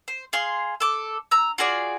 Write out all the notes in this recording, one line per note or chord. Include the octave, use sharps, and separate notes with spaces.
C5
G#4 F5 C6
A4 D6
A#5 E6
F4 F#4 G#4 D5